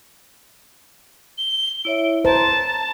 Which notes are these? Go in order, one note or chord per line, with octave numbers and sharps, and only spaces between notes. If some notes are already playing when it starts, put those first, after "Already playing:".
G7
E4 C#5 E5 D7
C5 A5 A#5
A5